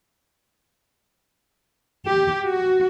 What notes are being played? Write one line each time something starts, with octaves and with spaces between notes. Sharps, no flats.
G4
F#4